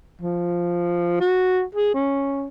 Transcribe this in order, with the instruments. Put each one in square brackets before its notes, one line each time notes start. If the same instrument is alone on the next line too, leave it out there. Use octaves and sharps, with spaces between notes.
[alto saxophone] F3
F#4
G#4
C#4